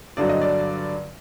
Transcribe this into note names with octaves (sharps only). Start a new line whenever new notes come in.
G2 D3 F#3 D5
D#5
D5